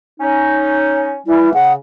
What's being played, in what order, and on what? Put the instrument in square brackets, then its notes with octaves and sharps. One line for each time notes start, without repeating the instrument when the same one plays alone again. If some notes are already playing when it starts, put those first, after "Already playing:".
[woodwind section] C#4 D#4
[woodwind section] E3 G3 [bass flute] E4
[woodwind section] C#3 [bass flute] F#5